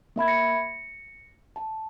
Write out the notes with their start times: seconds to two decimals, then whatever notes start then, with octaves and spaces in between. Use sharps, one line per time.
0.16 A#3 E5 B5 G#6
0.28 A#6 C#7
1.56 A5